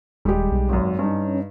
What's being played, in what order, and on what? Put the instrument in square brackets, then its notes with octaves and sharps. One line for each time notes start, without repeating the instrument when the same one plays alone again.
[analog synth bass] D#1 [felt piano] G3 G#3 G4
[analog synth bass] B1
[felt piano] G#1 F#2
[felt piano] G2 D#4 [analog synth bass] C#4